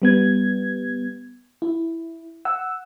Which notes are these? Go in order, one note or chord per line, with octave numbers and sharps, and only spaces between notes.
G3 B3 G#6
E4
F#5 E6